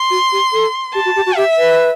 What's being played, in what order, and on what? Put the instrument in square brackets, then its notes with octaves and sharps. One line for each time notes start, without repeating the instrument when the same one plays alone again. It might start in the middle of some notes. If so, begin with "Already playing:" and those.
Already playing: [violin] C6
[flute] F#4
G4
A4
[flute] G4 [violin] A5
[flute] F#4
G4
F#4
[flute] G4 [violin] E5
[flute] B4